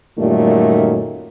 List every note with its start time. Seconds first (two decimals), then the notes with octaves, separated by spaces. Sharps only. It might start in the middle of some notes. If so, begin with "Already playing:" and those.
0.19 F#2 A#2 D#3 G3 A3